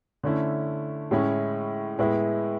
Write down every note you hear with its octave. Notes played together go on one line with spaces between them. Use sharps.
D3 A3 C#4 E4
A2 G#3 C#4 E4
A2 G#3 B3 E4